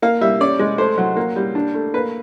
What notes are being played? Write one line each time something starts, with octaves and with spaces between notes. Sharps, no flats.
A#3 F5
G3 E5
C#4 D5
G#3
A3 C5
F#3
A#3
G3
D4
A3
A#3 B4